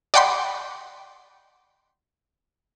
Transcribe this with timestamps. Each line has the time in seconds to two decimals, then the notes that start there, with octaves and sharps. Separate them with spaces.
0.14 D5 D#5 F#5 G5 B5 C6